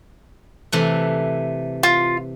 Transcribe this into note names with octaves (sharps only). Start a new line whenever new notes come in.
C3 E3 A3
F4